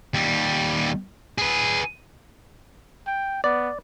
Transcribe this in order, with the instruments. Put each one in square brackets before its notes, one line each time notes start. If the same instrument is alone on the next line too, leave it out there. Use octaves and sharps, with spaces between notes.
[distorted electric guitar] D#2 G3
G#4 B4
[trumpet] G5
[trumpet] B3 [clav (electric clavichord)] D5